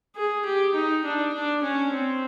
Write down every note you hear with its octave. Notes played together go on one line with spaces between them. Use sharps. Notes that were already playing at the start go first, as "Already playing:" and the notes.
G#4
G4
D#4
D4
D4
C#4
C4